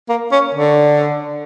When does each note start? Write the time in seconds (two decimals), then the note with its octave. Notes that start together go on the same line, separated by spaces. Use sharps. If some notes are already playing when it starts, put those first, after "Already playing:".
0.09 A#3
0.32 C#4
0.55 D3